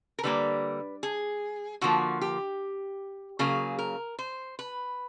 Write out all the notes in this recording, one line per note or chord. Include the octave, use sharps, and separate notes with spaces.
A#4
D3 G3 A#3 B4
G#4
D3 F3 A#3 F#4
G4
C#3 F#3 A#3 G#4
A#4
C5
B4